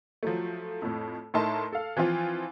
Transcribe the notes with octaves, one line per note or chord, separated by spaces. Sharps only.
F3 F#3 A3
F2 A2
A2 D#4 A#4 E5 A5 C6
A4 F5
E3 F3 C4 F4